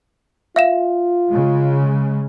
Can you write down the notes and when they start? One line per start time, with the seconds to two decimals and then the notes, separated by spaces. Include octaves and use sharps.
0.56 F4 E5 F5 E7
1.31 C#3 G#3